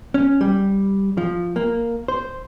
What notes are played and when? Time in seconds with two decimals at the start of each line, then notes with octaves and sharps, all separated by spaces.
0.14 C#4
0.41 G3
1.17 F3
1.56 A#3
2.08 C5